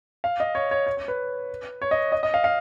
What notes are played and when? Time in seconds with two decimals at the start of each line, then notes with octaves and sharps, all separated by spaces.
0.24 F5
0.40 D#5
0.55 C#5
0.71 C#5
0.87 C#5
0.97 C#5
1.08 B4
1.82 C#5
1.91 D#5
2.12 D#5
2.23 D#5
2.34 F5
2.44 F5